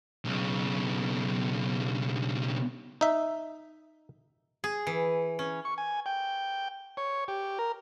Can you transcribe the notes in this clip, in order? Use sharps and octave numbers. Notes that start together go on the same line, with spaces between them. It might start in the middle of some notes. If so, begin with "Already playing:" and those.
B1 C#3
D#4 E5
G#4
E3
C#4
C#6
G#5
G5
C#5
G4
A#4